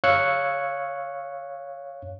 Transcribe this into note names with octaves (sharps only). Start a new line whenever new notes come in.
C#5 F5 E6 F#6 G#6 C#7